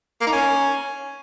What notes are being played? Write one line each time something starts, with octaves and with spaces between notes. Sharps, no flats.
A#3
D#4
C#4